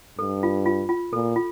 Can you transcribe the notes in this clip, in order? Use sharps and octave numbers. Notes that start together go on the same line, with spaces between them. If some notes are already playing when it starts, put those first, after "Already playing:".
G2 A4
F4
F4
F4
A#2 A4
F4